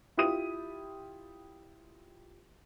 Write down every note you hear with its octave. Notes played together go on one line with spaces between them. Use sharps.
E4 F4 G4 D#6 D#7